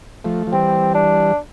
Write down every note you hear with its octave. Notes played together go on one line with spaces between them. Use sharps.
F3 A3
F3
E3 G3 C4
D4